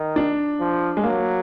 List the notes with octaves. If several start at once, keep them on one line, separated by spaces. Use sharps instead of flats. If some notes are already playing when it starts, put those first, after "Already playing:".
Already playing: D#3
D4
F3
G#3
F#3 A#3